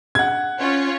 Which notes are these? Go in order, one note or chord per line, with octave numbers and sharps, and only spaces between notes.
F#5 G#6
C#4 F4 C#5